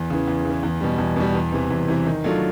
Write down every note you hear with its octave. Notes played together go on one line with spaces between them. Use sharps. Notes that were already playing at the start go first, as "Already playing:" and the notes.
Already playing: E2
C#3 E3
E2
C#3 E3
E2
B2 G3
E2
B2 G3
E2
C3 E3
E2
C3 E3
D#3
F#3 A3 D4 F4